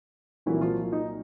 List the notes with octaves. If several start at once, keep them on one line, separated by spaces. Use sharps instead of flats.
C2 A#2 E3 F#3 A#3 E4
F3 F4
D#4